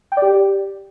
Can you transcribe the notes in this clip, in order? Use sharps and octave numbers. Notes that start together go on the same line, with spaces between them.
G5
D5
G4